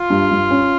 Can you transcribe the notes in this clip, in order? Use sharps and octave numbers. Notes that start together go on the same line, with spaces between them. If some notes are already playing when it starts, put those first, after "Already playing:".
Already playing: F4
G2
G2
C#4